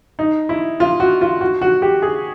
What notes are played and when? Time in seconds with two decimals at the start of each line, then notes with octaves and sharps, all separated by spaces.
0.19 D#4
0.49 E4
0.80 F4
1.00 F#4
1.21 F4
1.41 F#4
1.61 F#4
1.82 G4
2.02 G#4